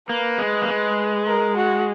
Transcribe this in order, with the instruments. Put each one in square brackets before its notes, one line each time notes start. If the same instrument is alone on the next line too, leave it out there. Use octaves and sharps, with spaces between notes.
[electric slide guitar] A#3 [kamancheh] B4
[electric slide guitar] G#3
A#3
G#3
[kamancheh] A#4
F#4